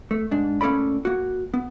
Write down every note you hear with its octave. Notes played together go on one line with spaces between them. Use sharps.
A3
G#2 D4
A2 A#3 C#4 A4 D5 B5
A#3 F#4
B3